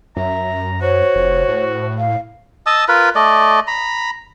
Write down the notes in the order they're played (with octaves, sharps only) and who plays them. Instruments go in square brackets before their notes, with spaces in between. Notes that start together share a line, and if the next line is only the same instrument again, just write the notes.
[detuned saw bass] F#2 [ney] E5 [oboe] A#5
[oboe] F#4 [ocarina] C5 [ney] C#5
[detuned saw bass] F1
A2
[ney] F5
[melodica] D#5 A5 D#6 E6
F4 A#4 B4 B5
A3 D5 D#5
A#5 B5